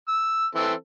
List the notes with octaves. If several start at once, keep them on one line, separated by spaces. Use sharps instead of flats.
E6
E3 C4 A4